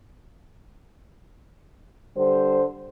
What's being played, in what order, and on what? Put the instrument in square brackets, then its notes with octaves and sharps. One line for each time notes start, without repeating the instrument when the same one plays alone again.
[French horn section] D3 G3 C5